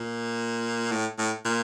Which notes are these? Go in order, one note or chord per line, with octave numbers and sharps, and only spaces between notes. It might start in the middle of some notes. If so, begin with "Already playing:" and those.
Already playing: A#2
A2
A2
A#2